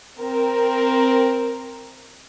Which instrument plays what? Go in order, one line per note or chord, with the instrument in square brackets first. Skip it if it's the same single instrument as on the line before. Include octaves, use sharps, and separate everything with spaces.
[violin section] C4 A#4